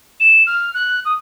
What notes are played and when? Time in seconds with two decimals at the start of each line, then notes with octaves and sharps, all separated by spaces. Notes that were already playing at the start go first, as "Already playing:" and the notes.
0.19 E7
0.46 F6
0.74 F#6
1.04 D#6